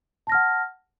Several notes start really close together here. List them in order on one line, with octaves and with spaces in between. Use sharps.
A5 A#6 F6 F#5